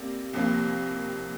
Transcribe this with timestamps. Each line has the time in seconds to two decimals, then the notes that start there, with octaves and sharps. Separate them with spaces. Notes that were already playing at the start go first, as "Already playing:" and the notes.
Already playing: C3 G3 A#3
0.33 C2 C3 F3 A#3